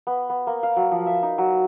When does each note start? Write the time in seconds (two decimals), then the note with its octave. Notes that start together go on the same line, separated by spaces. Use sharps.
0.07 B3
0.30 B3
0.47 A#3
0.63 F5
0.76 F#3
0.91 F3
1.06 E5
1.23 D#4
1.38 F#3